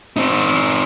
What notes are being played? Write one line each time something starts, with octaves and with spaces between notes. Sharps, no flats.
C4 D#4